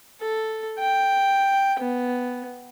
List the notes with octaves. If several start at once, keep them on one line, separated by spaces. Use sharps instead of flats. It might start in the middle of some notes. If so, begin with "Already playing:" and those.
A4
G5
B3